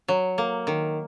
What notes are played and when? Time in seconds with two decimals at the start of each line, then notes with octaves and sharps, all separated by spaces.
0.08 F#3
0.38 A#3
0.67 D#3